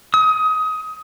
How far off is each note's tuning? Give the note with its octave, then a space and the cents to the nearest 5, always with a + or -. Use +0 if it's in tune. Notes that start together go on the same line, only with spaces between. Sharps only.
D#6 +20